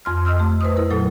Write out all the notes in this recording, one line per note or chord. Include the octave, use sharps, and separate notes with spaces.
F2 C6 F6
D#5 C6 E6 F6
A3
B4 C5 D#6
E4 A#4
A#2 F#3 A4